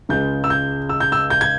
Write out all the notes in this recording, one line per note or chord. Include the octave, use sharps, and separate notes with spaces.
C#2 C#3 G#3 G6
E6
G6
E6
G6
E6
G6
G#6